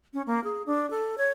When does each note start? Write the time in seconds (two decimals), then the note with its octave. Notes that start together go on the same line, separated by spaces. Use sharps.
0.14 C#4
0.27 A#3
0.44 G#4
0.66 D4
0.90 A4
1.18 C#5